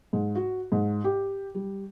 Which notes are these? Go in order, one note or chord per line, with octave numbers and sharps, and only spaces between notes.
G#2
F#4
G#2
G4
G3